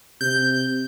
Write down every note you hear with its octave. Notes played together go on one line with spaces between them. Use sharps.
C3 G6